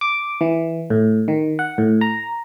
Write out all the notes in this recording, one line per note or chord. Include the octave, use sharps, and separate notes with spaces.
D6
E3
A2
D#3
F#5
A2
A#5